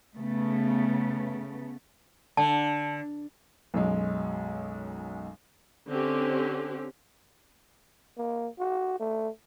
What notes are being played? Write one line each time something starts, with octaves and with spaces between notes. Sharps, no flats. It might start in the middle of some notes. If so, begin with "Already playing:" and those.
C#3 A3 B3
D3 A5
B1 F#2 G#3
D3 C4 C#4 G4
A#3
F#4
A3